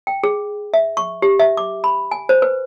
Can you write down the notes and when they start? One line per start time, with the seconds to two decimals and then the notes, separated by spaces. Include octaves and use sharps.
0.07 G5
0.24 G#4
0.74 E5
0.97 C#6
1.22 G4
1.39 E5
1.57 D6
1.84 B5
2.11 G#5
2.29 C5
2.42 B4